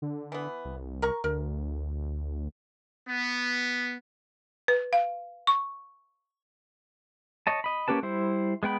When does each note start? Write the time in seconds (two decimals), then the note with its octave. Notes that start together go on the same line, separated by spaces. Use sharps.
0.02 D3
0.32 E3 B3
0.65 C2
1.02 A#4 A#5 C#6
1.24 D2 A#4
3.06 B3
4.68 B4
4.93 F5
5.47 C#6
7.47 C#5 D#5 A5
7.64 D#5 B5
7.88 A#3 C#4 G4 B4 A5
8.03 G3 E4 C5
8.63 G#3 B3 G5 B5